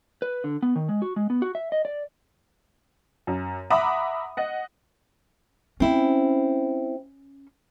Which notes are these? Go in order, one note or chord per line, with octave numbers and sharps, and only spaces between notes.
B4
D3
B3
D#3
G#3
F#4
G#3
B3
F#4
E5
D#5
D5
F#2
E5 F#5 A#5 B5 D6 D#6
D#5 F#5
C4 C#4 E4